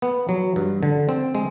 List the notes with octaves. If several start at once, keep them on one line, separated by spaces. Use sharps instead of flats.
B3
F#3
G2
D3
C4
G#3